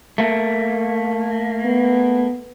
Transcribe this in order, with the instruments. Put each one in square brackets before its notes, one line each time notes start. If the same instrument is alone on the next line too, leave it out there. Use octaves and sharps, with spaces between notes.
[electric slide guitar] A3 A#3
[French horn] B3